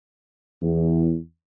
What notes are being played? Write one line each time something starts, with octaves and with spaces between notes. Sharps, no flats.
E2